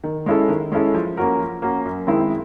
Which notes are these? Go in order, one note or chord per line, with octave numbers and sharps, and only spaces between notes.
D#3
G#3 C#4 E4 A4
D#3
G#3 C#4 E4 A4
F3
A#3 C#4 F#4 A#4
F3
A#3 C#4 F#4 A#4
F#2
D#3 G#3 C4 E4